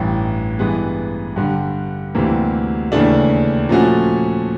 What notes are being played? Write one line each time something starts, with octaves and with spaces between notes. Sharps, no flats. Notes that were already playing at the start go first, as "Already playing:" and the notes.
Already playing: A1 G2 E3
G2 E3 G#3 B3
G2 D3 G3
D2 C3 E3 G3 A#3
D#2 C#3 E3 A3 D4
A#2 F3 A3 C#4 F#4